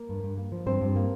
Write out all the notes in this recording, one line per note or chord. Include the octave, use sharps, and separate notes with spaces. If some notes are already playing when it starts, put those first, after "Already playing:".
Already playing: A#3 A#4
G2
G2
A#3
F3
G2 C4 C5
G2
A#3